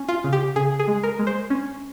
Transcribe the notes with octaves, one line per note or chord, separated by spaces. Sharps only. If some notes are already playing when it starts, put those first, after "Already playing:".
Already playing: C#4
F4
C#3
G4
C#3 G#4
G#4
G#3
A#4
G#3
C5
C#4